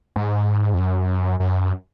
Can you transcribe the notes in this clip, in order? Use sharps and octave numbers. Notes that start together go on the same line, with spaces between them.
G#2
F2
F#2
F#2